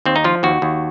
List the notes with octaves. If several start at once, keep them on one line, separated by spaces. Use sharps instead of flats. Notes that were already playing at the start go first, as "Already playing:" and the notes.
D#2 C4
D#4
F3 F4
D#2 F#4
D#2